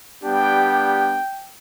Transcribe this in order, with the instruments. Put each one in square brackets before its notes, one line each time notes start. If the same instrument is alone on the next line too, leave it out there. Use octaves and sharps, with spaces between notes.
[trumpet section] G3 B3 D4 G4 G5